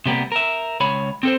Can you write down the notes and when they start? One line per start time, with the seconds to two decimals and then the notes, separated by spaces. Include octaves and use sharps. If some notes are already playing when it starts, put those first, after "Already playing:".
0.06 C3 G3 A#3 B3
0.32 A#4 E5
0.80 C#2 C#5 B5
1.23 C4 A4 C5